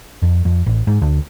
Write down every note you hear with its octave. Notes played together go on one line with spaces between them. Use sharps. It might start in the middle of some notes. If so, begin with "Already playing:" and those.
F2
F2
A1
G#2
D2